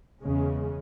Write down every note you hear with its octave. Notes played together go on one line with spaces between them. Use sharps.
E2 C#3 G#3 C#4